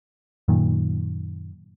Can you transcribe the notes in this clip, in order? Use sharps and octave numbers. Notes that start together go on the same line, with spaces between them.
F#2 A#2 D#3